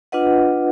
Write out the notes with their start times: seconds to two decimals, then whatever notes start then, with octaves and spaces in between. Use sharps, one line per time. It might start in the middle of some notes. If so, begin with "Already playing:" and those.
0.12 D4 F4 B4 D#5 F#5